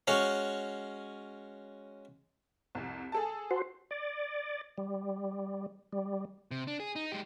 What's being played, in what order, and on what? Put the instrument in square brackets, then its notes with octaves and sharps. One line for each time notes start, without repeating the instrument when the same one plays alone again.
[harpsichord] G#3 C#4 F#4 C#5 F5
[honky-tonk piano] C2 F2
G#4 A4 A5
[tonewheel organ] F#4 C5
D5
G3
G3
[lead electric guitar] C3
D4
G#4
D#4
G#3 G4